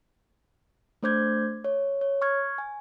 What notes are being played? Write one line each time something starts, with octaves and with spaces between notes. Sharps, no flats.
A3 D4 C5 D6 G6 G#6
C#5
C#5
C#6 F6 G#6
G#5